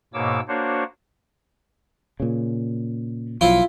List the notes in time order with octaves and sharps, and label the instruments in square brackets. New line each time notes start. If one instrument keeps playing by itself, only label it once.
[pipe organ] G#2 B2 A#3 C#5 D6 E6
A#3 D4 F#4 C5 C#5
[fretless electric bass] A#2 C#3
[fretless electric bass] B1 F3 F#3 [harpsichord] E4 F4